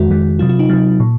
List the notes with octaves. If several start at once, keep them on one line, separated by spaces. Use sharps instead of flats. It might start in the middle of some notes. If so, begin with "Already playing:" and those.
Already playing: F2 D#3 G#3 F#4
F2 D#3 G#3
C3 F#3 F4
F4
D#4
C3 F#3
A#2